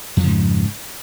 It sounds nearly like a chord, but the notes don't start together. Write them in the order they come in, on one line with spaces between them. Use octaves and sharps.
F2 F3 C#3 G#2